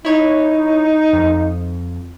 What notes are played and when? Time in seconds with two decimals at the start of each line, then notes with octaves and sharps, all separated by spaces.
0.05 D#4 E4 C#5
1.13 F2